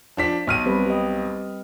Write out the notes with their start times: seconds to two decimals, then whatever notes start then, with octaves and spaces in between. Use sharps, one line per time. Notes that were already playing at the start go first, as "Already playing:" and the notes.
0.17 F3 D4 B6
0.47 B1 F6 D#7
0.66 G3 C4 B4
0.86 G4 D#5